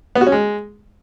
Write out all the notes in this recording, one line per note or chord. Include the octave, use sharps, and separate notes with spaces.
B3
F#4
C#4
G#3